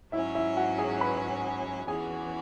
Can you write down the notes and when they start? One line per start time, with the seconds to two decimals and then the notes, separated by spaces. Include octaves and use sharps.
0.12 G#2 F#3 C#4 E4 E5
0.35 E4 E5
0.57 F#4 F#5
0.78 G#4 G#5
1.01 B4 B5
1.88 E2 E3 C#4 F#4 G#4 G#5